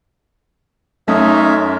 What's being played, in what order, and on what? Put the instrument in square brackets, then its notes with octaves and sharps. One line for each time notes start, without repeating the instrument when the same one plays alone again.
[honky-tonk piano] F#2 D#6 [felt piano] A3 [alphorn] D#4 [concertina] C#5 E5 F5